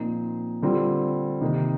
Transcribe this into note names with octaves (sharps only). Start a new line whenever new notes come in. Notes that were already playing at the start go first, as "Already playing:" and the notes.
Already playing: A#2 F3 C4 D#4
D3 G3 C4 F4
C3 D#3 A#3 D#4